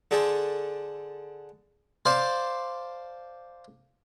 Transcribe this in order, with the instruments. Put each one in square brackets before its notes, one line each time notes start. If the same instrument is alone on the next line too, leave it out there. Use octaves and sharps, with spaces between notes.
[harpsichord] D3 D4 G#4 A4 C5
C5 D5 F5 A5 C6